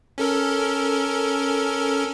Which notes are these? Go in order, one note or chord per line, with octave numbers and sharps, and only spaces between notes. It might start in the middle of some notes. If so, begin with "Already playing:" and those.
C#4 A4 A#4